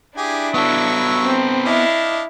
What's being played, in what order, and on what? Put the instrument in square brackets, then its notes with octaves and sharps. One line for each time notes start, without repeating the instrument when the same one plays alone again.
[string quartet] D4 E4 [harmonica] G4 G#4 G#5
[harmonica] F#3 C#6 E6 [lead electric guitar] B3 A4
[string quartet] C4
[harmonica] D4 D#5 F5 [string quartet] E4